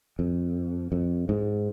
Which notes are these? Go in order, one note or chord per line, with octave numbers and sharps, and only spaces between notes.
F2
F2
G#2